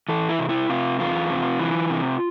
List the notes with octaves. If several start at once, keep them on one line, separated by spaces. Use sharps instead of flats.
E3 A4
E4
C3
E4
C3 F4
E2 F4
C3
E3
C3